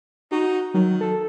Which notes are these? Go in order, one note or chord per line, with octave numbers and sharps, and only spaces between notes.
D#4 F#4
D#3 F#3
A4